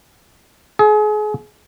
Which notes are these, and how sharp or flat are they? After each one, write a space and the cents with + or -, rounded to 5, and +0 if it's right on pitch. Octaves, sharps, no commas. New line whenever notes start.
G#4 +35